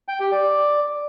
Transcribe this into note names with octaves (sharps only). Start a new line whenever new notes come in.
G5
G4
D5